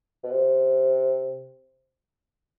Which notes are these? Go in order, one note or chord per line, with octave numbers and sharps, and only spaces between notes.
B2
C3